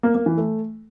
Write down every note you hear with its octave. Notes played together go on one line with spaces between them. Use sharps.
A#3
A#3
E3
A3